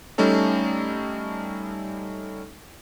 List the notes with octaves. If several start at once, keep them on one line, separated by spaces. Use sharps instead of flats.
G3 A3 C#4 D#4 A4